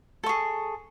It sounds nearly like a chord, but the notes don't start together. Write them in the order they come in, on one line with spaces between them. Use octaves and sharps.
A4 C#6 G#4